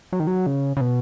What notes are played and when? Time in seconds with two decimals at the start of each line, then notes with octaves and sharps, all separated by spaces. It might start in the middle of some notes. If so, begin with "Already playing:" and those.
0.13 F#3
0.20 D#3
0.27 F#3
0.46 C#3
0.77 C#3
0.81 B2